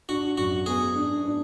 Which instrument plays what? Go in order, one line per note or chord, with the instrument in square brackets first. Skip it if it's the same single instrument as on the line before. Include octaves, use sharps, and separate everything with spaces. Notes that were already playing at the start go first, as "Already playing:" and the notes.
[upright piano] D4 [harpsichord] F#4
[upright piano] F#2 [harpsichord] F#4
[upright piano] B3 [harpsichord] G#4
[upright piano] D4
D4